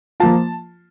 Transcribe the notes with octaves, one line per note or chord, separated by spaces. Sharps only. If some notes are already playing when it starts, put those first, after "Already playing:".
F3 A#3 F4 A5